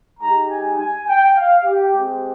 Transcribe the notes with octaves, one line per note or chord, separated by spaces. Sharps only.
G#3 D#4 G4 A#5
G#5
G#5
G5
F5
G4
G#3 C4 G4